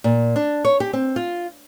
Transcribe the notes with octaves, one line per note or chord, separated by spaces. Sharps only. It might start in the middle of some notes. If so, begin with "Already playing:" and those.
A#2
D4
C#5
G4
C4
F4